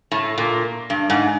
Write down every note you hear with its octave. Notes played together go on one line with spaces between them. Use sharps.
A2
A#2
G2
G#2